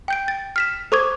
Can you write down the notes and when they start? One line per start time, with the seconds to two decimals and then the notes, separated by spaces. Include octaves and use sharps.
0.08 G5 G6 D7
0.28 A6
0.56 F6 B6 E7
0.92 A4 C5 C#6 D6 G#6